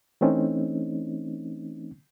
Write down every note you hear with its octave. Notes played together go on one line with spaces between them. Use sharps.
E3 A3 C4 C#4 D#4